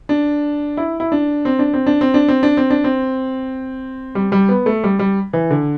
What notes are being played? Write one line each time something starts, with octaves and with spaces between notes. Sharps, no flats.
D4
E4
E4
D4
C4
D4
C4
D4
C4
D4
C4
D4
C4
D4
C4
G3
G3
B3
A3
G3
G3
E3
D3